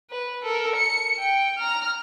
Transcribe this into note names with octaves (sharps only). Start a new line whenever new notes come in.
B4
A4 A#4
C#7
G5
A#5 F6